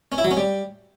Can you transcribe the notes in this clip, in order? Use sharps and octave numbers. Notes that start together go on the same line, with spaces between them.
C#4
E4
F#3
C#4
G3